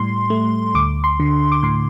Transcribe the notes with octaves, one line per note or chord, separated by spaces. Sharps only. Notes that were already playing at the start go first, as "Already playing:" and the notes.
Already playing: A2 G3 C6
A3
D2 D6
C6
D3
D6
A2 C6